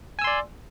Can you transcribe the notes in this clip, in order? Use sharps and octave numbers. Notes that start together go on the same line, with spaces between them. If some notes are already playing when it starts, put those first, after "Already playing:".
D5 G#5 C6 E6